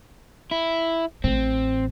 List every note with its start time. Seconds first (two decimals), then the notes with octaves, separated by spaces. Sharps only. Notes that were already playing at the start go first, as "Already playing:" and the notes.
0.51 E4
1.24 A1 A2 C4